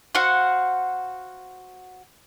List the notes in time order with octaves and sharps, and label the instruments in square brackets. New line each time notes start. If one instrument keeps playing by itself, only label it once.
[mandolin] F#4 C5 F5 F#5